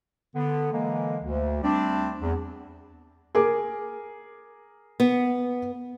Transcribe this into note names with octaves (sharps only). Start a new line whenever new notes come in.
D3 B3
D3 E3 G#3 A#3
D2
G3 A3 C4 D4
E2
G#4 A#4 D6
B3